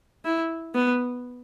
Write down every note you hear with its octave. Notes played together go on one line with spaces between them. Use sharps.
E4
B3